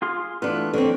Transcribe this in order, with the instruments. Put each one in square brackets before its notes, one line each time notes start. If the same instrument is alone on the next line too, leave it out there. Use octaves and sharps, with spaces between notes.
[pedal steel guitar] F4 G#4 C6
[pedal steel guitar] E3 A3 F4 [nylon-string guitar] B3 D4
[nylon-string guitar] D3 C4 [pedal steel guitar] F3 A#3 C#5